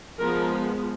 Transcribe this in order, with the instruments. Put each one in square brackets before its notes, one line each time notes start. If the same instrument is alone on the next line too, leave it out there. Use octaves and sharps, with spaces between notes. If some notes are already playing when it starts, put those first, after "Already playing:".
[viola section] F3 G#3 B3 A#4